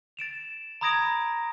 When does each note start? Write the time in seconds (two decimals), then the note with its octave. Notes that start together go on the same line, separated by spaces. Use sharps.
0.17 A6 D7 E7 F7
0.81 A#5 B5 D#6 G#6 A#6 D7